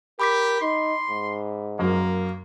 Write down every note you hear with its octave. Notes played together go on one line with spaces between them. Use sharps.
G4 A#4 B5 D6 B6
D#4 C6
G#2
F#2 A#3